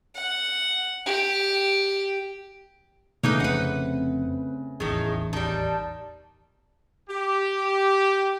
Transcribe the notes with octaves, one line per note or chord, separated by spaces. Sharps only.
F#5
G4
C#3 E3 A3 A#3 D#4 B4
F1 F2 C4 B4 F#5
D#1 A1 E2 A2 D#3 G#4
D#3 G3 A5
G4